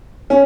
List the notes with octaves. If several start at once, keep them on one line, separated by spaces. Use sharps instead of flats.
C#4